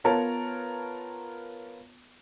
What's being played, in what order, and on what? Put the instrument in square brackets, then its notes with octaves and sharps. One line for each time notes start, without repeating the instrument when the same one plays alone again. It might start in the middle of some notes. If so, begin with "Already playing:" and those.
[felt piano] B3 F4 A#4 C#5 A5